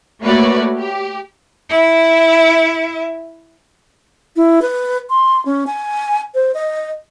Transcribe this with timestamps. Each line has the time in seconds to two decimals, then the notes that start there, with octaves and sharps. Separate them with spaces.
0.21 A3 A#3 F#4 B4 C#5 D5
0.77 G4
1.69 E4 E5
4.36 E4
4.62 B4
5.10 C6
5.46 C#4
5.67 G#5
6.34 C5
6.54 D#5